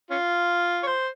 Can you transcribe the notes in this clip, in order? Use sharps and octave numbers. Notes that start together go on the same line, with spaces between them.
C#4 F4
C#5
C5